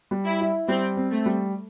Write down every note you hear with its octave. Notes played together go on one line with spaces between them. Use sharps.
G3
E4
E4
G3 C4
C4
A3
G3